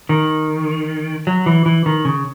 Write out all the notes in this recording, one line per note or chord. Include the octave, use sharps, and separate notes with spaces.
D#3
F#3
E3
E3
D#3
C#3